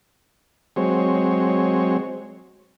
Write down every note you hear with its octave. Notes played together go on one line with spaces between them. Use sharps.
F#3 G#3 C4 C#5